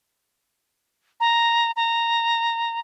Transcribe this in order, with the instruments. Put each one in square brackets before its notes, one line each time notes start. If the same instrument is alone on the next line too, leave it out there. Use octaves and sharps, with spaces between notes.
[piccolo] A#5
A#5